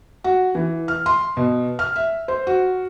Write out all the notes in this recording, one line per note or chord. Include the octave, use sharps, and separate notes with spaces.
F#4
E3
F6
C6
B2
F6
E5
C5
F#4